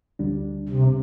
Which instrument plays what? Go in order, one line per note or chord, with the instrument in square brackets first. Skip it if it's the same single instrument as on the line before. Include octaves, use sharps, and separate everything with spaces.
[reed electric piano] D2 D3 G3 D4
[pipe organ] C3